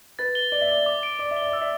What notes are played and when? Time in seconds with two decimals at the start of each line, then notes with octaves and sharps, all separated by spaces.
0.19 B4 A6
0.35 G7
0.52 D5 G7
0.61 E5
0.69 D5 G7
0.86 D6
1.03 D7
1.19 D5 D6
1.31 E5
1.36 G7
1.42 D5
1.53 D5 E6
1.61 E5